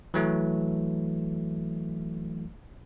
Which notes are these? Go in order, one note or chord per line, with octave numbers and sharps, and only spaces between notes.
E3 F#3 A3